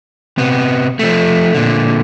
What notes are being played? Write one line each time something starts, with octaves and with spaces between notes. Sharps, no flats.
C3 B3
F3 A3
A#2 D3